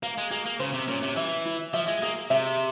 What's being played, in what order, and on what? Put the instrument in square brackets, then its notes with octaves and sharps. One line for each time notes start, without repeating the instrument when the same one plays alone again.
[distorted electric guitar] A#3 [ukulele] F5
[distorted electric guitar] G#3
[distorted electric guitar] A#3 [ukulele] G#4
[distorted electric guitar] A#3
[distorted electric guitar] C#3 [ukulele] C5
[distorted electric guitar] C3
[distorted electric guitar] A#2 [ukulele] C#4
[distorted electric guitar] C3
[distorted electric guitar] E3 [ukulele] E5
[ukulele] E4
[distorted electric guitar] F3 [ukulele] E5
[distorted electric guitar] G#3
[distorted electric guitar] A#3 [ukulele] G#4
[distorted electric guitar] C3 [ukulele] E5